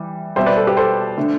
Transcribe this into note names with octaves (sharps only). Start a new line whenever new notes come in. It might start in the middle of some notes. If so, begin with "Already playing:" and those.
Already playing: E3 G3
B2 G3 C4 C5 E5
B4 D5
A4
G4 B4
A4 C5
D3 A3 D4